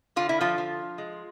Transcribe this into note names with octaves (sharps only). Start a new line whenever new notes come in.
D3 F4
E4
F3 F4
F3
G#3